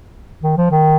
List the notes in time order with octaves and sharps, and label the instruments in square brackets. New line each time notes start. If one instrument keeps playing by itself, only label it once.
[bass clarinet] D#3
F3
D#3